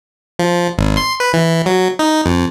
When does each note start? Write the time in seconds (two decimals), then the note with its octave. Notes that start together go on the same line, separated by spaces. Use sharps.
0.39 F3
0.78 G#1
0.97 C6
1.20 B4
1.33 E3
1.66 F#3
1.99 D#4
2.26 F2